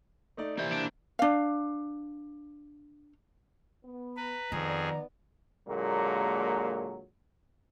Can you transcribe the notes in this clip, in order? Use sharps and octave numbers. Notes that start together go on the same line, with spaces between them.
A3 D#4 D5
C3 E3 A#3 E4 C5 D5
D4
D4 F5
B3
B4 A#5
F2 D#3 B3 D#4 G#4 D5
A#2 D3 F#3 G#3 A#3